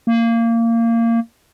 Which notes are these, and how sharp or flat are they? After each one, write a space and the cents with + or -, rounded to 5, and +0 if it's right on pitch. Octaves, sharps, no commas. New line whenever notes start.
A#3 -20